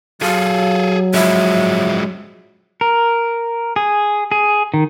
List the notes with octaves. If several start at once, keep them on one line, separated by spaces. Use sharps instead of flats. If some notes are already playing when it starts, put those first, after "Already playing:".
F#3 G#4 A4 F5
F3 G#3 E5
A#4
G#4
G#4
D#3